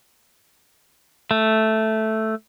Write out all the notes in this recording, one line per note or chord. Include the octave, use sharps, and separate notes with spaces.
A3